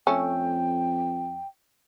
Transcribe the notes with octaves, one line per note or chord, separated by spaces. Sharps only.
F2 A3 C#4 G5